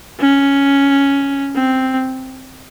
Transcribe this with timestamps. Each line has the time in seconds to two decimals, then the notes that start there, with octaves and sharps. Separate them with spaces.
0.20 C#4
1.55 C4